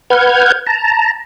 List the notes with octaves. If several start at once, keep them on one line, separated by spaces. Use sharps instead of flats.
B4 F#5 F6 G6 G#6
A5 A#5